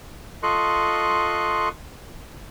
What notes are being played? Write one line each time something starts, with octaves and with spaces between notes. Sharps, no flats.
F4 A4 D#5 C6 C#6 F#6